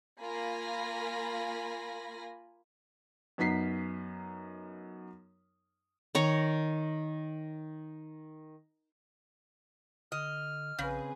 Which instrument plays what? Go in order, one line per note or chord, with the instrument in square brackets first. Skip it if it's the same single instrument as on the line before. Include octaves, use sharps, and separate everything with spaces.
[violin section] A#3 F4 G#5 B5 A#6
[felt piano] F#2 B3 D#4 B6 C7
[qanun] D#3 C#5 A#5
[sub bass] D3 [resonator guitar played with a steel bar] D#5 [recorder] F6
[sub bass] A#1 [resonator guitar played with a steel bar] C#3 [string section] C4 G#4 B4